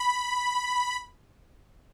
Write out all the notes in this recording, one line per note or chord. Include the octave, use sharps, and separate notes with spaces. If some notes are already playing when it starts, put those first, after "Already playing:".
Already playing: B5